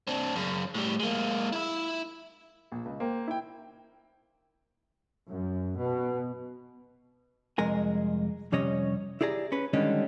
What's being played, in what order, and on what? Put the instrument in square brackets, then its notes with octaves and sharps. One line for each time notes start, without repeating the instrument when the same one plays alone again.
[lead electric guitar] C4 D4
F#2 C#3
A2 G3
G#3 A#3
E4 E5
[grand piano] A#1
C#2
A#3 C5 G5
E4 G5
[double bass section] F#2
B2
[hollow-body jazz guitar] C2 F2 G#3 A#4 G#5
F2 C3 G3 C#4 C#5 D#5
E4 G4 G#4 D5 A#5
C#4 B4
D3 D#3 G3 G#3 C#4 D4